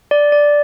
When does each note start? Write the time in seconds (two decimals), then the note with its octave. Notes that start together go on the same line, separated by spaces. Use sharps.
0.11 D5
0.32 D5